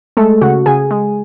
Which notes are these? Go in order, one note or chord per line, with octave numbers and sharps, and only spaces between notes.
G#3 A3 A4
C#3 F#4 F#5
C#3 G#4 G#5
G#3